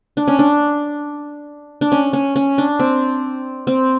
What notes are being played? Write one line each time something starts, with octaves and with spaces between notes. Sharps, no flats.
D4
C#4
D4
D4
C#4
C#4
C#4
D4
C4
C4